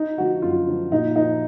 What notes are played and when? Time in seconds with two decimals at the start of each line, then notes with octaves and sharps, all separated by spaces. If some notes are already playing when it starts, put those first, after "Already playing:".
Already playing: D#4
0.17 D3 F3 F#4
0.42 F#2 F4
0.67 D3 F3
0.92 A#2 D#4
1.16 F3 D#4